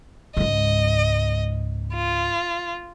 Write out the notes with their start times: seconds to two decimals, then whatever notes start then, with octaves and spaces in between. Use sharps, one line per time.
0.37 C#2 G#2 D#5
1.94 F4